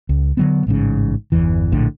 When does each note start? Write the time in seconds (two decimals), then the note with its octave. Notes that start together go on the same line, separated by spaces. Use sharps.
0.09 C#2
0.37 D3 F#3 B3
0.67 A1 G#2 C#3
1.32 G1 E2 E3
1.72 A#1 A2 D3